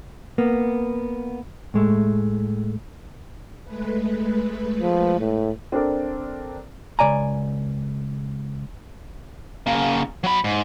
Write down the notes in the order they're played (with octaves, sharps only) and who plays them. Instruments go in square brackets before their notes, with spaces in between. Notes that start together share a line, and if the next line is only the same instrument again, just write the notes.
[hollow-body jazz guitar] A#3 B3
A2 G#3 A3
[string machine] G#3 A3 B4
[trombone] F3
A2
[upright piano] C4 D4 A4 A#4 D5
[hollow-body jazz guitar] C#2 G3 D5 G#5 A#5
[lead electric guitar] C#3 A#3
F#3 B5
G#2